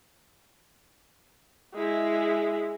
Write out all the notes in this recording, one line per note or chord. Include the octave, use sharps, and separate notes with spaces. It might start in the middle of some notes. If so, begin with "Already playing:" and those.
G#3 E4